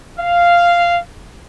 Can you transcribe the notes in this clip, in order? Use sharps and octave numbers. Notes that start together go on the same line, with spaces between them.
F5